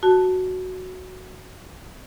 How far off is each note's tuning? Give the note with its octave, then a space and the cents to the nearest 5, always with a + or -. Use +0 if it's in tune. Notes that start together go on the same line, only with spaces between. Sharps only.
F#4 +0 A5 +0